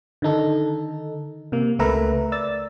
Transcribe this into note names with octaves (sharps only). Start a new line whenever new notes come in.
D3 D#3 D#4 A4
C3 A#3
C#2 A3 A#4 B4 E5 A#5
D5 E6 A6